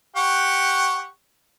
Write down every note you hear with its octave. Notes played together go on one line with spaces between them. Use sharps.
G4 F#5 C#6